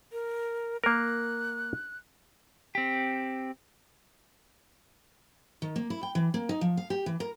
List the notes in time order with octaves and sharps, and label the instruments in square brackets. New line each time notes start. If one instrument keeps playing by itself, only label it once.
[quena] A#4
[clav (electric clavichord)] A#3 A#4 [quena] F#6
[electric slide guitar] C4 G4
[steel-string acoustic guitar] D#3
A#3
E4
G5
E3
A#3
D#4
F3
F5
G4
E3
A#4